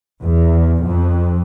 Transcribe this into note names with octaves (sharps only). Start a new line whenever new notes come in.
E2
F2